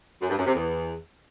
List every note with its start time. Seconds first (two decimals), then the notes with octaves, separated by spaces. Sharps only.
0.21 F#2
0.30 G2
0.38 F#2
0.46 C3
0.55 E2